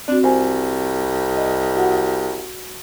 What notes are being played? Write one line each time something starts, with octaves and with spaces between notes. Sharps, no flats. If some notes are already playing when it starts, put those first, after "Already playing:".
C4 D4 F#4
C2 C5 G#5
D#5
F#4 F#5